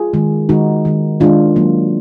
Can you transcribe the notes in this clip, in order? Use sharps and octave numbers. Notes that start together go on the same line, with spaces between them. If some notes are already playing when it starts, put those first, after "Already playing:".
Already playing: F4 G#4
D#3 G#3
D#3 G#3 D#4 F#4
D#3 G#3
D#3 G#3 D4 F4
D#3 F#3 A#3